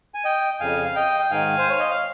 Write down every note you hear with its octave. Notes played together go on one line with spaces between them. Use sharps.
G#5
D#5 G5
F2 C#3 F5 G#5
F5
D#5 G5
G5
G#2 D#3 F5 G#5
C5
C#5
D#5
F5